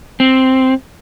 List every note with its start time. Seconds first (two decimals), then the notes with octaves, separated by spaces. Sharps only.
0.20 C4